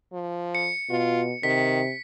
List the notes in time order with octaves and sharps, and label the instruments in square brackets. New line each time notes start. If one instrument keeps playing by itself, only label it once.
[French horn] F3
[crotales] C#7
[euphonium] B2 [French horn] F4
[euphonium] C3 [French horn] D#3 [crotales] B6